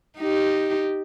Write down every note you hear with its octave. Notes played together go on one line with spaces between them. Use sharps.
D#4 G4